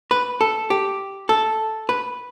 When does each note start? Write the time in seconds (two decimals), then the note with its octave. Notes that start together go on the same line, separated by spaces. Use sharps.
0.11 B4
0.41 A4
0.70 G4
1.29 A4
1.89 B4